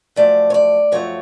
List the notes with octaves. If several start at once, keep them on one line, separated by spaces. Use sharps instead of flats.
F#2 F3 A3 D5
C#5
D5
F#2 F3 A3 C#5